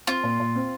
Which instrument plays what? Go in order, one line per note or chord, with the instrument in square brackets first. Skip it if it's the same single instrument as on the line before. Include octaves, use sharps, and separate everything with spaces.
[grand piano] C4 [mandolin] F4
[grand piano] A#2
A#2
C4